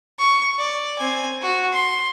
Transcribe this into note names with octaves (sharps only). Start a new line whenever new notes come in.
C#6
D5
C4 G#5
F#4
C6